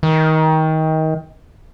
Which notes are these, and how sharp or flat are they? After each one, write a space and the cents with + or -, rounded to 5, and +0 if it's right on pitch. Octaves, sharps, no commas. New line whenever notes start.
D#3 +25